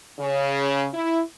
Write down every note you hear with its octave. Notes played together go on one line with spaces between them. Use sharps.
C#3
E4